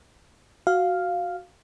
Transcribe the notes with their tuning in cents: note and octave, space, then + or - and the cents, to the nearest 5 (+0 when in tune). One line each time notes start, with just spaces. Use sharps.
F#4 +0 F5 +0